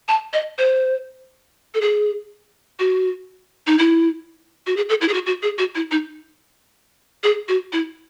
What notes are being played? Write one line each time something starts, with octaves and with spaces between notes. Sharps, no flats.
A5
D#5
C5
A4
G#4
F#4
D#4
E4
F#4
G#4
A4
E4
G#4
F#4
F#4
G#4
F#4
E4
D#4
G#4
F#4
E4